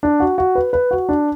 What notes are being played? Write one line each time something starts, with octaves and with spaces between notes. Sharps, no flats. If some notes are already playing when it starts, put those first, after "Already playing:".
D4
F#4
F#4
B4
B4
F#4
D4